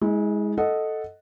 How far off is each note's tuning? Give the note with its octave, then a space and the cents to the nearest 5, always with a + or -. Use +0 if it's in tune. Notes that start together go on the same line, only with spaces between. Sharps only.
G#3 +0 E4 -40
A4 +0 D#5 +0 F#5 +0